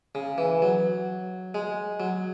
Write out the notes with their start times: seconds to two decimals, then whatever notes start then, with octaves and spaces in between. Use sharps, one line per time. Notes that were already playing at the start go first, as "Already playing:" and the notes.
0.15 C#3
0.38 E3
0.62 F#3
1.54 G#3
2.00 F#3